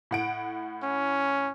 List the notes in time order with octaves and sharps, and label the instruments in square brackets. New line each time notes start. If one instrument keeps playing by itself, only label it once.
[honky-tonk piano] A2 F#5 D7
[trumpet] C#4